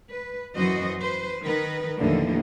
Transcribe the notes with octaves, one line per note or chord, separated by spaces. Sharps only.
B4
F#2 E3 F#4 C5 D#5
B4 C5
D#3 A#4 B4
D#2 A2 D3 E3 F3 A#3